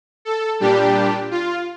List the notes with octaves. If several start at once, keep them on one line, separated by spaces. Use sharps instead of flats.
A4
A#2 G3 D4 G4
F4